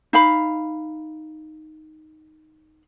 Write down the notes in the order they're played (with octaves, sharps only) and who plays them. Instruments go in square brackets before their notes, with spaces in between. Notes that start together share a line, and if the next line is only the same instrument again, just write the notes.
[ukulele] D#4 F5 B5